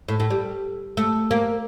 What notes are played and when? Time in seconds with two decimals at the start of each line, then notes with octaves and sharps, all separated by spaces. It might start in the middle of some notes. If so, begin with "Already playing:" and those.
0.08 A2
0.20 A2
0.30 G3
0.97 A3
1.31 A#3